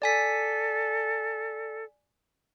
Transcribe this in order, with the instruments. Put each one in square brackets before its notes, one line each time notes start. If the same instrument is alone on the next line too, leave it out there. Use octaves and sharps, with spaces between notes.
[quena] A4 [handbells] D5 G#5 B6